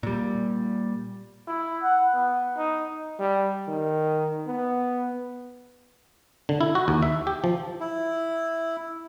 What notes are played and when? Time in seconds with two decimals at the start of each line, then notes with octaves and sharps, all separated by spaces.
0.03 A#2 G3
1.47 E4
1.83 F#5
2.14 B3
2.57 D#4
3.19 G3
3.68 D#3
4.47 B3
6.49 D3
6.61 E4
6.75 F#4
6.88 D#2
7.02 E5
7.27 G4
7.44 F3
7.80 E4